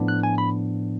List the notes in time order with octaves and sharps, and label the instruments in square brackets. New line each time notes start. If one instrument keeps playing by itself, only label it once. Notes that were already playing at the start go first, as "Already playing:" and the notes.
Already playing: [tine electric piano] A2 F3 B3 D4
F#6
G#5
B5